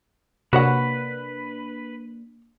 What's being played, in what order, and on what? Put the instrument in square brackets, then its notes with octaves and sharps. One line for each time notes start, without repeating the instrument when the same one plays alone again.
[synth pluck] C3 [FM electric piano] A#3 D4 [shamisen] F#4 C#5 F#5 [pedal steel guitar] B4